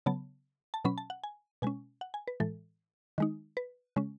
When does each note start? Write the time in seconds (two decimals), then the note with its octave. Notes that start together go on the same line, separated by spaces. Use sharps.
0.06 C#3 F#3 B3 A5
0.74 A5
0.85 B2 F#3 C#4 B5
0.98 A5
1.10 F#5
1.24 G#5
1.62 B2 G#3 C#4 G#5
2.01 F#5
2.14 G#5
2.28 B4
2.40 A2 E3 G#3 A4
3.18 D#3 G#3 D#4
3.57 B4
3.96 C#3 G#3 C#4